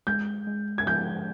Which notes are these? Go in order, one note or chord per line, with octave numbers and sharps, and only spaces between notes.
G#3 G6
G#3
G#6
F3 G6